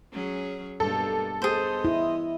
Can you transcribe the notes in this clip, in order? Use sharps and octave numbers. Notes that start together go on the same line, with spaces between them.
F#3 C#4 G#4
G2 B2 A#3 A4
B3 G#4 C5 D#5
E4